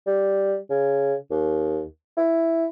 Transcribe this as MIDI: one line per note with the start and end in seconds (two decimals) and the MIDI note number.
0.07 0.56 55
0.70 1.15 49
1.31 1.84 39
2.17 2.66 64